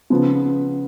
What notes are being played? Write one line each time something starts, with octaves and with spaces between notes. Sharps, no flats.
C#3 F3 B3